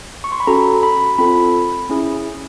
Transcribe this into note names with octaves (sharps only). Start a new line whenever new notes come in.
C#6
C6
B5
C#4 F#4 A4 A#5
B5
C4 F4 A4 B5
C#4 E4 G#4